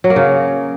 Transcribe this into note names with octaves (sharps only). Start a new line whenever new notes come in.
F#3
A#3
C#3